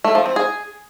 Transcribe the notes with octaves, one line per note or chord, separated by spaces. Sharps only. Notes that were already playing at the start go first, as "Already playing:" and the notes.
A3
F3
C4
G#4